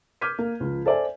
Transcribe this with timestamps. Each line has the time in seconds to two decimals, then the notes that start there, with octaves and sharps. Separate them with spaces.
0.21 D6 F6 G6 G#6 B6 D#7
0.39 A#3
0.60 C#2 F3
0.86 A4 C5 D5 E5 G#5